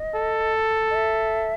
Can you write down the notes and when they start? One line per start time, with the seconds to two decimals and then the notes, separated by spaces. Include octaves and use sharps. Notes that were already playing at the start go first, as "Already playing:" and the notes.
Already playing: D#5
0.15 A4
0.90 D#5
0.95 E5